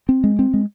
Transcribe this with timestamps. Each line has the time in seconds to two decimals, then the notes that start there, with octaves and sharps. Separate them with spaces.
0.09 C4
0.24 G#3
0.39 C4
0.54 G#3